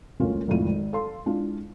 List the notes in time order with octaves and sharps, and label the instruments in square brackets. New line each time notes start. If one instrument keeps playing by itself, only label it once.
[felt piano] E1 A1 D2 A#3 C#4 F4
G#1 F2 A2 F4 D#7
G#1
A4 F5 C6
G#3 D4 E4 F4